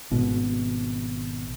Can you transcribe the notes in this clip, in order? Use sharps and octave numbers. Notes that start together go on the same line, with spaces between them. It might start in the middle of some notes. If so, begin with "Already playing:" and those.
G#1 B2